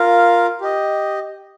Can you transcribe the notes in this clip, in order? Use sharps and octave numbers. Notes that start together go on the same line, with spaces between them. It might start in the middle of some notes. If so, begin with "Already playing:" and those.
Already playing: F4 A#4 F5
G4 D#5